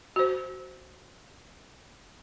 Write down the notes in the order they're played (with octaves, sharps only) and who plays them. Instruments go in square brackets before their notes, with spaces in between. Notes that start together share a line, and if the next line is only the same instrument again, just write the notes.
[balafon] F#4 C5